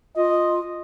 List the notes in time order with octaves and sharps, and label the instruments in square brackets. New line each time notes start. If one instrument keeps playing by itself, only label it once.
[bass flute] F4 [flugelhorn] D#5